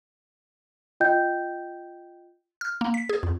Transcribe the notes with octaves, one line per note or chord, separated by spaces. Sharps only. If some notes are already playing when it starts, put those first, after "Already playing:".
F4 D#5 G5 G6
F6
A#3
B6
G#4
F2